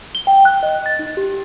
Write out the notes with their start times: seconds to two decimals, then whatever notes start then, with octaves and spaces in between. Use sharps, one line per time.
0.15 G7
0.27 G5
0.45 F#6
0.63 D#5
0.86 A6
0.99 D#4
1.17 G4